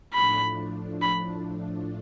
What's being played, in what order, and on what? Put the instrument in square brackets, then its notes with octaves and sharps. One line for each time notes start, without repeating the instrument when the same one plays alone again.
[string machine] A2 F3 A3 D4 [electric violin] B5
[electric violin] B5